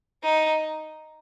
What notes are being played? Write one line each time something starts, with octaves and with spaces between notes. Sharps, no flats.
D#4